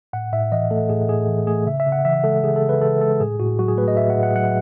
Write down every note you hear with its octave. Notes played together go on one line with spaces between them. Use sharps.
A2 F#5
A2 E5
E3 D#5
A3 A4
A2 G#4
A2 G#4
E3
A3 G#4
C#3 E5
E5
C#3
F#5
E3 E5
G#3 A4
C#3 G#4
A4
C#3
B4
E3 A4
G#3 A4
A2 G#4
A2 F#4
F#3 F#4
G#4
A3 B4
D#5
A2 E5
F#5
A2
F#5
F#3 F#5